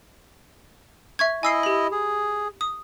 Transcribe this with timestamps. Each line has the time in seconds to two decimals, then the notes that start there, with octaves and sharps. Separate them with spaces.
1.19 E5 C#6 G#6
1.43 E4 D#5 G#5 E6 C7
1.63 G4 B5
1.92 G#4
2.61 D#6